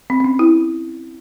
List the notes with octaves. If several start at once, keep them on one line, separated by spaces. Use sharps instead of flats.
C4
C4
C#4
E4